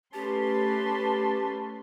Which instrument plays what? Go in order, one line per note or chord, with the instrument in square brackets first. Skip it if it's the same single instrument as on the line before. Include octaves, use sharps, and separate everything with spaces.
[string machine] A3 [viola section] C#4 B4 C6 [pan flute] G4 [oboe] A5